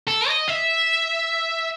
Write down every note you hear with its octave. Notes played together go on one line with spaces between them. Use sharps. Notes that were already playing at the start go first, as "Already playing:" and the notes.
A4
D#5
E5